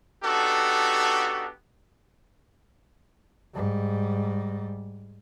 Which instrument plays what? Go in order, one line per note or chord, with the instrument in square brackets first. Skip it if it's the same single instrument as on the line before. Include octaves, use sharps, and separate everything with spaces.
[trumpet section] B3 D4 D#4 F#4 G4 A4
[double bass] G#2 G3